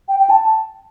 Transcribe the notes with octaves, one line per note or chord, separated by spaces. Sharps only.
G5
G5
A5